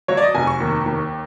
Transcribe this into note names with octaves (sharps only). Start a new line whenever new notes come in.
F#3 C#5
D5
D#5
F1 G#5
C#6
D#2
D#2